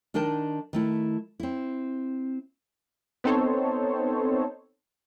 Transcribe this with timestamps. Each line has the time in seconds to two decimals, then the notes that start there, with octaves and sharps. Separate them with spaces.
0.14 D#3 D4 D#4 A#4 G5 A5
0.73 D#3 A3 E4
1.40 C4 E4
3.24 B3 C4 D#4 A4 C5 C#5